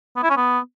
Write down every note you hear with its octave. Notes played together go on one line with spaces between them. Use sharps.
B3
E4
C#4
B3